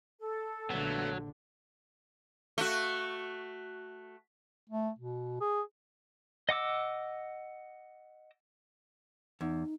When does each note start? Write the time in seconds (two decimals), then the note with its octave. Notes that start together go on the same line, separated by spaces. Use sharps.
0.21 A4
0.70 A#1 D3 F#3 A3 B3
2.58 A3 F#4
4.69 A3
4.99 B2
5.41 G#4
6.49 D#5 F#5 D6 E6
9.41 E2 D#4